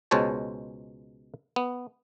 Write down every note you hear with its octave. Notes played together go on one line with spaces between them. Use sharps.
C#2 B2 G#3 C5 C#5 A5
B3